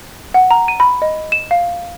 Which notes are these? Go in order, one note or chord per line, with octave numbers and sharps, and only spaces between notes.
F#5
A#5
D#7
B5
D#5
E7
F5